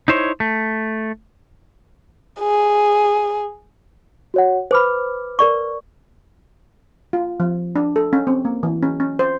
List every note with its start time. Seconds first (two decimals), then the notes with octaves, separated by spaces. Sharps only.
0.08 D#4 E4 C5 C#5
0.40 A3
2.40 G#4
4.34 F#4 C#5 F#5
4.71 B4 C5 B5 D6 F6
5.39 A#4 D5 C#6
7.13 F4
7.40 F3
7.76 D4
7.96 A4
8.13 C#4
8.27 C4
8.45 A#3
8.63 E3
8.83 C#4
9.00 C#4
9.19 C5